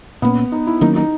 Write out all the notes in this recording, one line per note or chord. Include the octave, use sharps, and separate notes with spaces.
A#2 A#3 B3 C#4
D#4
E4
D#3 F#3 A#3 C#4 D#4
D#4